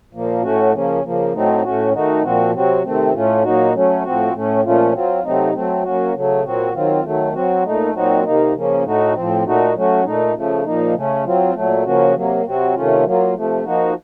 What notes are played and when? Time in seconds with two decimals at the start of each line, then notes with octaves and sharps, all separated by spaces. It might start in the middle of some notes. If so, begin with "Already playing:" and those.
0.13 A#2 F3 A#3
0.43 A2 A3 C#4 F#4
0.73 C#3 F3 A#3 C#4
1.03 C#3 F3 A#3
1.33 A2 F#3 A3 C4 D#4
1.63 A2 A3 C#4 F#4
1.93 D#3 A3 D#4 F#4
2.23 A#2 F3 C4 F#4
2.53 C3 F#3 C4 F#4
2.83 C3 D#3 A3 C4
3.13 A2 A3 C#4 F4
3.43 A#2 F#3 A#3 D#4 F#4
3.73 F#3 A3 C#4
4.03 A2 F3 C4 F#4
4.33 A2 A3 C#4
4.63 A#2 F3 A3 C#4 F4
4.93 F#3 C4 F4
5.23 C3 F#3 A3 C4 D#4
5.53 F#3 A3 C4
5.84 F#3 A#3 C#4 F#4
6.14 C#3 F#3 A3
6.43 A#2 F#3 C4 F#4
6.74 D#3 F#3 C4 F4
7.03 D#3 F#3 A3
7.33 F#3 C4 F#4
7.63 A#2 A3 D#4
7.94 A#2 F#3 C4 D#4 F#4
8.24 C3 D#3 A#3 D#4
8.54 C#3 F3 A#3 C#4
8.83 A2 A3 D#4 F#4
9.14 A2 F3 C4
9.44 A#2 A3 D#4 F#4
9.74 F#3 A3 C#4 F#4
10.04 A#2 A3 D#4
10.34 C#3 F3 A3
10.64 A#2 F3 A#3 D#4
10.94 C#3 A3 C#4
11.24 F#3 C4 F4
11.54 A#2 F#3 A3
11.84 C#3 F3 A#3 C#4 F#4
12.15 C3 F#3 A#3
12.45 C3 F#3 C4 F#4
12.74 C3 D#3 A3 C#4 F4
13.04 F#3 A#3 F4
13.34 C3 F3 A3
13.64 F3 A#3 D#4 F#4